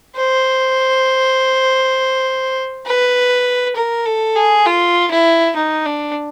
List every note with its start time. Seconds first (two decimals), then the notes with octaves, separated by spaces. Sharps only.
0.16 C5
2.86 B4
3.76 A#4
4.06 A4
4.36 G#4
4.66 F4
5.11 E4
5.56 D#4
5.86 D4